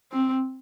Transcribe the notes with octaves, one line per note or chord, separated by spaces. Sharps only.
C4